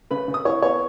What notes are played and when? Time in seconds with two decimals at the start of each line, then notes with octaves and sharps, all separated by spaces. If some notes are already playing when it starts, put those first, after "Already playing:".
0.11 C#3 B4 B5
0.28 C#3
0.34 D#6
0.45 E4 C#5 C#6
0.62 B3 C#5 C#6